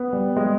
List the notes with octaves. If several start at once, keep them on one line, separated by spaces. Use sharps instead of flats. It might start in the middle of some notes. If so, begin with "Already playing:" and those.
Already playing: B3
G3
G#3